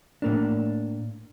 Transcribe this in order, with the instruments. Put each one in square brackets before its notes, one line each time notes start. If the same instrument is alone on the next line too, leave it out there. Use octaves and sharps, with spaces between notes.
[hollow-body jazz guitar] A2 A#3 D4